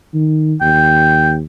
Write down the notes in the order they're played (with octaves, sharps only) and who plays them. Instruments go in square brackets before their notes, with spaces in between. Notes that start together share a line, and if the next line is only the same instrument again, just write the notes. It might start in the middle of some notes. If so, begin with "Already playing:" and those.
[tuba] D#3
[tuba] D#2 [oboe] G5